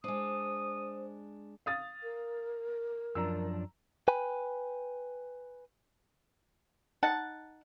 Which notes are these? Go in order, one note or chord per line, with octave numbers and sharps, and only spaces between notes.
G#3 D4 C5 D#6
F5 D#6 A6
A#4
F#2 F3 D4 A#5 E6
B4 G5 G#5 B5
D#4 F#5 A5